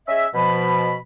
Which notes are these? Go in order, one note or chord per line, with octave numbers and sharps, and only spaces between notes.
C#4 G#4 D#5 E5
B2 F3 B5